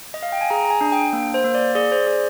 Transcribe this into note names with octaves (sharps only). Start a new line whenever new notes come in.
D#5
F5
G5
G#5
G#4 A#5
A#5
G#5
D4
G5
A#3
C5
A#3
D5
G#4 D5
C5
G#4 D5